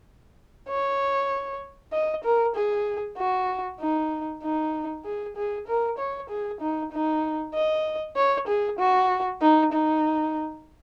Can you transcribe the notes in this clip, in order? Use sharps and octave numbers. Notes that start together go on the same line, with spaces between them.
C#5
D#5
A#4
G#4
F#4
D#4
D#4
G#4
G#4
A#4
C#5
G#4
D#4
D#4
D#5
C#5
G#4
F#4
D#4
D#4